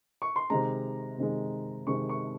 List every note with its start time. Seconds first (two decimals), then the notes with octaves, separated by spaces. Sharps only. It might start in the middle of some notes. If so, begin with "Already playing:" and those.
0.22 C#6
0.36 C6
0.50 C3 D#3 G#3 A#5
1.18 C3 D#3 G#3
1.87 C3 D#3 G#3 C#6
2.09 C#6